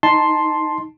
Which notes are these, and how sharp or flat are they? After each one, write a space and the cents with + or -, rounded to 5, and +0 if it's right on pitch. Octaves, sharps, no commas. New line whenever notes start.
D#4 +0 A5 +0 C6 +5